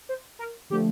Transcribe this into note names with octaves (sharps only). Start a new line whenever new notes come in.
C5
A#4
D3 F3 A3 G4